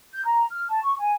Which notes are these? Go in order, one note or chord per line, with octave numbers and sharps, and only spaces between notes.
G6
A#5
F6
A5
C#6
G#5